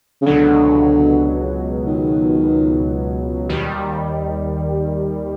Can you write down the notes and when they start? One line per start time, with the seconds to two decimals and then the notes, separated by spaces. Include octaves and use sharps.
0.21 C#3
0.26 C#2 B2 D3 F#3
1.87 D#3
3.49 D#2 D#3 G3